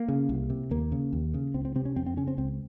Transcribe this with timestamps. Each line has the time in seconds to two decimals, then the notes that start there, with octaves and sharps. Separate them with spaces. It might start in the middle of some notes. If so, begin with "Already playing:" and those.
Already playing: A#3
0.08 C#3
0.29 C2
0.50 C3
0.71 D#2 A#3
0.92 C#3
1.13 D#2
1.34 C#3
1.54 C#2 C4
1.65 C4
1.75 C3 C4
1.85 C#4
1.96 F2 C4
2.06 C4
2.17 C#3 C#4
2.27 C4
2.38 C#2 C4